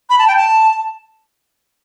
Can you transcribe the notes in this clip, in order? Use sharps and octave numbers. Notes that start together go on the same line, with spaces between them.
B5
A5
G5
A5